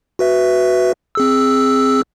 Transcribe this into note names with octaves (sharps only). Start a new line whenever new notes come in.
F#4 B4 E5
C4 G#4 E6